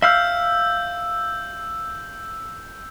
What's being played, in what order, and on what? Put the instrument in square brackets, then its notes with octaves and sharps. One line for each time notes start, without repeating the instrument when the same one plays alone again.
[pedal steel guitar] E5 F5 F6 [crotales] E6 G6